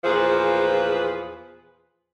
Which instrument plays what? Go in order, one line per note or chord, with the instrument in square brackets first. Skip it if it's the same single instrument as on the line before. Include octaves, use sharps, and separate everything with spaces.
[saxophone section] E2 A#2 F3 G#4 B4 C5